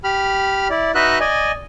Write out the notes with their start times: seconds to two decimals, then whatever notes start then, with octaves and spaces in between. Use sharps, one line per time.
0.04 G4 B5 F6
0.70 E4 D5
0.95 D#4 F#4 B4 D#5 E5 F#6
1.20 D5 D#5 G#5